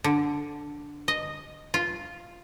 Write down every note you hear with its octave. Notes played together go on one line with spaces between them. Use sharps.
D3
D#5
F4